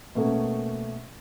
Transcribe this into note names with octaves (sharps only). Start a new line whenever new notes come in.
B2 A3 A#3 C#4